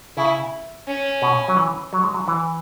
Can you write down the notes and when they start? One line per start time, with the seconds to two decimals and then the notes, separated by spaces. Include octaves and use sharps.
0.17 C#3 E4
0.87 C#4
1.22 B2
1.48 F#3
1.57 E3
1.93 F#3
2.03 G#3
2.14 F#3
2.28 E3